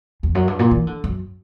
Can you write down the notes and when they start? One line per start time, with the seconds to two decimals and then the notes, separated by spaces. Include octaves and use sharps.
0.23 E2
0.35 F#2
0.47 G2
0.59 A#2
0.71 E3
0.87 D3
1.04 F#2